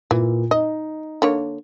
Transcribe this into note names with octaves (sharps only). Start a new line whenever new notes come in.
A#2 E3
D#4 D#5
D3 A#3 C#5